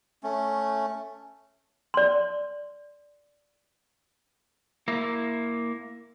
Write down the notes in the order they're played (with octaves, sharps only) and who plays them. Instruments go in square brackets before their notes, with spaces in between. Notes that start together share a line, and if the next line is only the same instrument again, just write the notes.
[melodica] A3 C#4
[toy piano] D5 C6
[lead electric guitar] A#3 E4